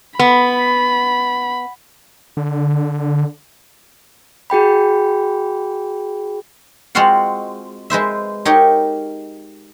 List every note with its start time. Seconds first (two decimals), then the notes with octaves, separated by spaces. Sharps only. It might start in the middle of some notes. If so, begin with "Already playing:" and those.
0.19 B3 B5
2.37 D3
4.50 F#4 G#4 G5 B5
6.95 G#3 C4 F4 F#4 F5 F#5
7.90 G#3 B4 C5 E5
8.45 D#4 G4 A#4 C#5